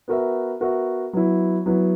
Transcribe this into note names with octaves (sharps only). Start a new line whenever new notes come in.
B3 F#4 A#4 E5
B3 F#4 A#4 E5
F#3 B3 E4
F#3 B3 E4